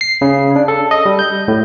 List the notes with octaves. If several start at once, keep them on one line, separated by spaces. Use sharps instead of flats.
C7
C#3
D4
A4
D#5
G3
G6
A2